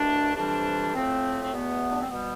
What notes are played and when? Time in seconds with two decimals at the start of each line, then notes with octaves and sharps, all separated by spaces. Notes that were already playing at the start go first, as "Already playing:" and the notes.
Already playing: C2 B2 A3 D4
0.36 F2 C3 E3 G3 D4
0.94 A2 F3 A3 C4
1.42 C4
1.52 E2 B2 A3 B3
1.91 D4
2.01 C4
2.10 B2 G3 B3